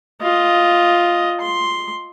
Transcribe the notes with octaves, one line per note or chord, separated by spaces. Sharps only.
F4 D#5
C6